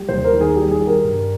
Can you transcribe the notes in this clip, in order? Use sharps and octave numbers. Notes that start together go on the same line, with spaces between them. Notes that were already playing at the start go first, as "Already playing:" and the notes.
Already playing: G3
D#2 C5
A#4
D#3
G#4
G3 G4
G#4
G3
A#4
G2